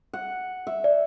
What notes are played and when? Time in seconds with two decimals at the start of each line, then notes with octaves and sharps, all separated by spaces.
0.13 F#5
0.67 E5
0.84 D5